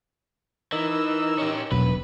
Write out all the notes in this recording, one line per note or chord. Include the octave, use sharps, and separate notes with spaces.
E3 D#4 A#4 E6
C#4 G4
E1 B1 B4